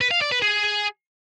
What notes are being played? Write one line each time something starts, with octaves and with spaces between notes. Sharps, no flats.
B4
F5
D5
B4
G#4